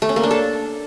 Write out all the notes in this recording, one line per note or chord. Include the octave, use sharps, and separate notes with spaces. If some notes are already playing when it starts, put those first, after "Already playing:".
A3
C#4
A#3
D4
A4